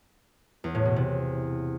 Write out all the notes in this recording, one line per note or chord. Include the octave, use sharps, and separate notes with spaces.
E2
A2
B2
C3